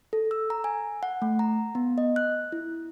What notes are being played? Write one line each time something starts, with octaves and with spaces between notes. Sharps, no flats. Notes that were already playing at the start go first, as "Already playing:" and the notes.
A4
E6
A#5
G#5
F#5
A3
A#5
B3
D#5
F#6
E4